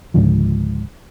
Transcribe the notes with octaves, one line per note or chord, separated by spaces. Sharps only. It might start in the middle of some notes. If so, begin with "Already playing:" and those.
C#2 G#2 D3 F3